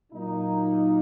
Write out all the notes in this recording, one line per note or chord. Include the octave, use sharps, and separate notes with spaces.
A#2 F#3 A#3 D#4